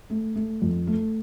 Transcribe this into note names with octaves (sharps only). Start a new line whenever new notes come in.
A3
A3
F2
A3